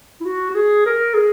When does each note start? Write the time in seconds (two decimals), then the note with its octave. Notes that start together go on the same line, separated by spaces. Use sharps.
0.21 E4
0.25 F#4
0.51 F#4
0.55 G#4
0.86 A#4
1.14 G#4